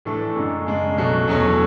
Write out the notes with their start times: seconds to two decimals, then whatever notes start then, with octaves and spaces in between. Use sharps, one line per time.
0.05 A2 E3 A3 D4 A4
0.36 F#2 D3 G#3
0.66 F#2 C#3 G#3 D4
0.97 B1 B2 F#3 A3
1.27 E2 B2 F#3 A3 C#4